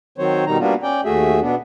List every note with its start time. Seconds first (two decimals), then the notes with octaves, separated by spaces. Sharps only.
0.18 D#3 F#3 C4 C5 C#5
0.47 B2 D#3 G3 D#4 A#5
0.59 G3 A#3 B3 D4 F4 F#4
0.83 C#4 D5 G5
1.05 D#2 A3 F#4 G#4 E5
1.41 B2 B3 D4